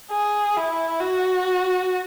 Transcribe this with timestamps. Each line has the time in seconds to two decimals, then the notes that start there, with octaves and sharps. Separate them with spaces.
0.11 G#4
0.57 E4
1.00 F#4